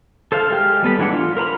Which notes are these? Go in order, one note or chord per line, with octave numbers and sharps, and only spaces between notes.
A4 C5 E5 F5
G#3 G4 F6
G3 B3 A4 B5
E3 F#3 G#3 D4 F#5
F4
A#4 C5 A#5 B5